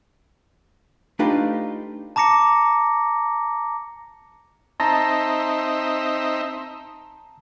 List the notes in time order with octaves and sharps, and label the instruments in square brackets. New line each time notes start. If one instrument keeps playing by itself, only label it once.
[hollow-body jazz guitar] A3 D4 D#4 F4 G4 B4
[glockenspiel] A5 A#5 D6 A#6 C#7
[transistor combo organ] C4 D#4 E5 [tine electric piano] A5 A#5 A#6